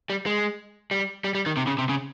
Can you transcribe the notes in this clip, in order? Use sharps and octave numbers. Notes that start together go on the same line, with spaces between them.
G3
G#3
G3
G3
G3
D#3
C3
C#3
C3
C#3